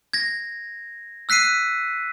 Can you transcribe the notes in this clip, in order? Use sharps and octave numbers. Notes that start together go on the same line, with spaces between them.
G#6 A#6
E6 F#6 B6 C7 D#7